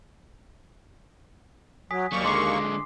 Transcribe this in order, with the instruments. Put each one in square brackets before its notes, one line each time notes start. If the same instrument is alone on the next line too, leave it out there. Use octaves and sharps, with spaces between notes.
[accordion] F#3 [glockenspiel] G#5 D#6 B6
[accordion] D#2 A#3 C#6 [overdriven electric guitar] F#3 G3
[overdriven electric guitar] D3 G#3 [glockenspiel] C6 D6 C7